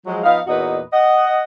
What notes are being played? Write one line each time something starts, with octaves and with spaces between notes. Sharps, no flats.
F3 F#3 G#3
F3 B3 D#4 F5
E2 A#2 D#4 F#4 B4 D#5
D#5 F#5